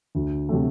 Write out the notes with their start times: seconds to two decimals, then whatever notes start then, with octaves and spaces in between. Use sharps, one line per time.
0.15 D2
0.49 C3 F#3 A3